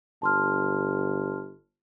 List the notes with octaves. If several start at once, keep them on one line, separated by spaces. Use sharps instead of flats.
G1 A5 C6 F6